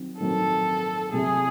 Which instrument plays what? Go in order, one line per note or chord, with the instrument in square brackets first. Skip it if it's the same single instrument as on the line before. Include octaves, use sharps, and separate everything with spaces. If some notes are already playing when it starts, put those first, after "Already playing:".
Already playing: [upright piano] D#3 F#3 C4
[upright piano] D#3 F#3 C4 [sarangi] A4
[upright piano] C3 F#3 A3 C4 E4 [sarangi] G#4